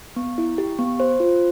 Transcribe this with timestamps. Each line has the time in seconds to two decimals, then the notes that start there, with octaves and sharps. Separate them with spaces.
0.16 B3
0.38 E4
0.58 G4
0.79 B3
1.00 C5
1.20 F4